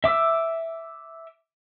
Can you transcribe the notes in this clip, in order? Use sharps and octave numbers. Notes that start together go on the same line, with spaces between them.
E5 D6 E6